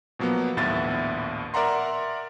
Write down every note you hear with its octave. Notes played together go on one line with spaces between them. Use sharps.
B2 F3 F#3 A#3 B3
A#1 D#2 A2 B3 E5 A6
A#4 D5 E5 F#5 A#5 C6